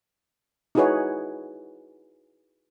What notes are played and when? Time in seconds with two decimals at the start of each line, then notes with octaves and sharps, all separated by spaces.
0.75 D#4 E4 F#4 G#4 B4 C#5